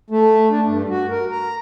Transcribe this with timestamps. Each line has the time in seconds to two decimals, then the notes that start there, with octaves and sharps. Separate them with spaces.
0.10 A3
0.50 D4
0.66 G2
0.89 F#4
1.10 A#4
1.31 A#5